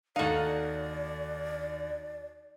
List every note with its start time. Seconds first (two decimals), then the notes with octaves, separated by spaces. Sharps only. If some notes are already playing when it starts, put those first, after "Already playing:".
0.16 D#2 D#4 F#4 A4 D5 F5 D#7